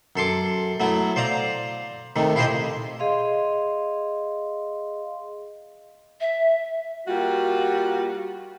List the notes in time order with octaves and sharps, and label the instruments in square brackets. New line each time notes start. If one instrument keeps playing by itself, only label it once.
[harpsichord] F#2 A4 C6 D6
F#3 A3 B3 E4
C5 D5 F5 A#5
C3 D#3 A3
E4 F4 G4 G#4 C5 D#5
[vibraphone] G#4 D#5 F5 C6
[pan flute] E5
[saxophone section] G3 A#3 F4 F#4